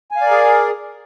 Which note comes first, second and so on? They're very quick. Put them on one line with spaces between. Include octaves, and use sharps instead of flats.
G#5 F5 D5 A#4 G#4